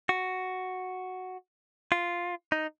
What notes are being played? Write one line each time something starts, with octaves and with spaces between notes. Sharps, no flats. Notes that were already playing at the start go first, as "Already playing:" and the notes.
F#4
F4
D#4